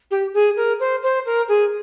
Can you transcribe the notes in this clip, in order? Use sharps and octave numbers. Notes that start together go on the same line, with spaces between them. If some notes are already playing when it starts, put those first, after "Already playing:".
G4
G#4
A#4
C5
C5
A#4
G#4